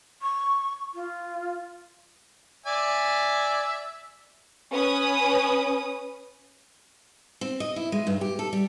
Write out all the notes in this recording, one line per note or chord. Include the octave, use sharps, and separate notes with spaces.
C#6
F4
D5 E5 G#5
C#4 B4 D#6
C4
D#5
E4
G#3
G2
G4
A4
G3